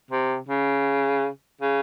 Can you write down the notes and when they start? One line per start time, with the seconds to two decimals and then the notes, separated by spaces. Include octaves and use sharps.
0.11 C3
0.48 C#3
1.61 C#3